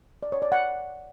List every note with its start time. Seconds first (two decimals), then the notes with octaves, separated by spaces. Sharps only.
0.23 D5
0.32 C#5
0.42 D5
0.52 F#5